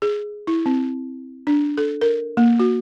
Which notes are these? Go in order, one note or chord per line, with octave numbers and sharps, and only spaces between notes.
G#4
E4
C4
D4
A4
A#4
A#3
F#4